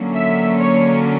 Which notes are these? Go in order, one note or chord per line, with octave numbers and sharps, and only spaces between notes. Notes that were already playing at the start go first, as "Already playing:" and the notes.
Already playing: D3 F#3 A#3 C#4
E5
C#5